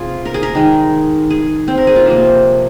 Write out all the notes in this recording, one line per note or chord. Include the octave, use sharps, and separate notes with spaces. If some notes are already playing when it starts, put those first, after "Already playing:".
Already playing: C3 F4 G#4
A#4
G#4
A#4
D#3 G#3
G#4
C4
A#4
G#4
F4
C3 F3 A#3